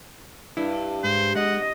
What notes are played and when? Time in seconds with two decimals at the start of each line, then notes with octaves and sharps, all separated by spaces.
0.57 G2 E4
1.04 G#2 C5
1.35 G#3 D#5 F#5